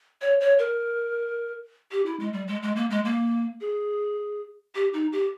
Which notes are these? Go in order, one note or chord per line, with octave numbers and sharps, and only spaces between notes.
C#5
C#5
A#4
G4
E4
G#3
G3
G#3
G#3
A#3
G#3
A#3
G#4
G4
D#4
G4